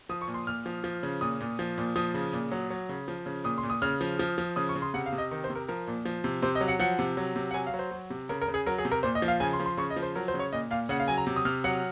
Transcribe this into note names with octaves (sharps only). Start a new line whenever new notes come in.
F3 D#6
C#6
A#2
C6
A#2 F6
F3
F3
C#3
A#2 D#6
A#2
F3
A#2
F3 D#6
C#3
A#2
F#3
F#3
C#3
F3
C#3
A#2 D#6
C6
A#2
D#6
C#3 F6
F3
F3
F3
C#3 D#6
C#6
C#3
C6
C3 F#5
F5
C3
D#5
D#3
C5
C3
A#4
F3 A#4
A#2
F3
C3
C3 C5
D#5
F#3
F#5
F3 F#5
C3
F#3
C3
F#5
F#3 G#5
F5
F#3
C5
F#3
C3
C#3 A#4
A#4
C#3
G#4
F#3 A#4
G#4
C3
A#4
A#2 C5
D#5
F3
F5
C#3 G#5
C6
F3
C6
C#3 C#6
D#5
F3
C5
F#3 A#4
C5
C#3
C#5
A#2 D#5
A#2 F5
C#3 F#5
F5
F#3 G#5
A#5
C3
D#6
C3 F6
F#3 F#5